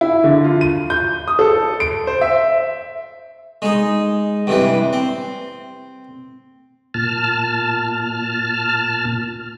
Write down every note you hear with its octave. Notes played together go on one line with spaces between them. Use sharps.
E4
D3
F4
D#7
G6
D#6
A4
D7
C5
E5
G#3 D#4
G2 C3 E3
C4
A#2 A5 F6